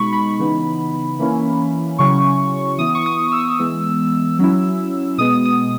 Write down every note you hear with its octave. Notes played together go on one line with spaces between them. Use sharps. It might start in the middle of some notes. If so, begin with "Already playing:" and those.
Already playing: B2 G#3 D#4 B5 C#6
B5
C#3 E3 B3 D#4
E3 A#3 C#4 E4
C#3 F#3 C#4 E4 C#6
E3 B3 E4 D#6
C#6
D#6
E6
E3 G#3 B3
F#3 C#4 E4
B2 G#3 B3 D#6
D#6